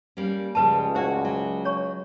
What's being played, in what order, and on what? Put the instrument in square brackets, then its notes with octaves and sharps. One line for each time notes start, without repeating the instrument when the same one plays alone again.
[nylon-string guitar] G3 A#3 C#4
[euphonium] C#2 [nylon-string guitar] C#3 F3 G3 [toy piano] B4 A5
[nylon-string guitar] A3 F#4 [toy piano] C5 D5
[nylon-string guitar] F#3
[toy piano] C#5 C#6